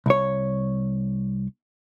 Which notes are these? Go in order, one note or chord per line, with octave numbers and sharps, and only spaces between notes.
C2 C#5